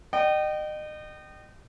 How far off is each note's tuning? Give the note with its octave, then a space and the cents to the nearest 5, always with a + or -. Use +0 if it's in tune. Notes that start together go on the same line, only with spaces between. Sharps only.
D#5 -35 G5 -30